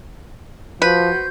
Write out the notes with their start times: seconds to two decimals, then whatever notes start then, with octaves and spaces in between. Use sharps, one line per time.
0.82 F3 F#4 B4 C5 G6